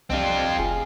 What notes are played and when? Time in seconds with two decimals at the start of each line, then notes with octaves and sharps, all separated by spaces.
0.10 C2 G3 C4 D4 F4 D#5
0.59 F1 F4 G#4